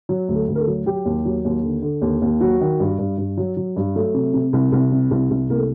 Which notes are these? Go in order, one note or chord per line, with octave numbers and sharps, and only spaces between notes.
F#3
D2
A4
D2
A#4
A4
F#3
F#3 G4
D#2
F#3
D#2
D3
D3
D#2
D#2
F#3 F#4
D#3
G2
G2
G2
F#3
F#3
G2
F#3 A3
C3
C3
C2
C2
C3
C2
C2
C2 A#3
A3